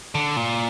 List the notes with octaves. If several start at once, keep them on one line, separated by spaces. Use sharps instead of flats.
D3
A#2